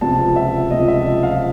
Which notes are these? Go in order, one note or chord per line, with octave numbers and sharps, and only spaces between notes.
C#2 C3 F3 A5
E5
C#2 C3 F3 D#5
E5
D#5
F5